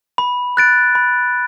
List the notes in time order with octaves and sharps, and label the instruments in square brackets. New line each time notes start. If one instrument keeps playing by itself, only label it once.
[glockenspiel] B5
F#6 A6 D7
B5